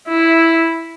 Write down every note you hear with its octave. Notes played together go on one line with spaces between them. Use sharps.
E4